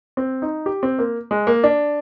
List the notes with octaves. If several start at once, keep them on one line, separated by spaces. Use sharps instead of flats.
C4
D#4
G4
C4
A#3
G#3
A#3
D4